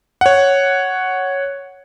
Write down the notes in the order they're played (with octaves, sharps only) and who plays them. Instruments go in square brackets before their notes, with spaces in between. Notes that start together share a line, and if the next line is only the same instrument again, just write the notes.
[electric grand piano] C#5 F#5